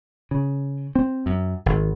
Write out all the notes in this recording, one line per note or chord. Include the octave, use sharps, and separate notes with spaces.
C#3
C4
F#2
G#1